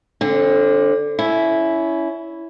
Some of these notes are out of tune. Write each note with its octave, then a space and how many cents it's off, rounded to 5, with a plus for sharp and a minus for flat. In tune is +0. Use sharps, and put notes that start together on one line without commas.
D3 +0 C4 +40
C#4 +25 E4 +0